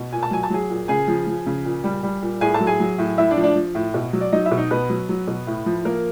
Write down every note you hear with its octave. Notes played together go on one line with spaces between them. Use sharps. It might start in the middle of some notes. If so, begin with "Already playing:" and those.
Already playing: B2
A#2 G#5
A5
F#3 G#5
A5
F#3 G#4 G#5
A#2
C#3 G#4 G#5
F3
F3
C#3
A#2
G3
G3
A#2
A2 G#4 G#5
A4 A5
F#3
G#4 G#5
F#3
A2
A2 E4 E5
D4 D5
F3
D4 D5
F3
A2
B2
F#3
D5
F#3 D#4 D#5
E4 E5
B2
D#4 D#5
B2 B3 B4
F#3
F#3
B2
A2
F3
F3 A#3 A#4